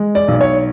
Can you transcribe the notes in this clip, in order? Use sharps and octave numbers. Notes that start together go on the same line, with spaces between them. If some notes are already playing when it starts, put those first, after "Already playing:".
Already playing: G#3
D5
B1
C#5